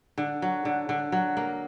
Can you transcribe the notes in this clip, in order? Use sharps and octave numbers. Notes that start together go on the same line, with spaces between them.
D3
F#3
D3
D3
F#3
A#3